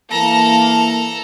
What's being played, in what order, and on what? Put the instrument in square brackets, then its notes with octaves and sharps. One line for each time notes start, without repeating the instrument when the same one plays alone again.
[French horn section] E3 A#3 [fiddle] A4 [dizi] A5 [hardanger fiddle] A#5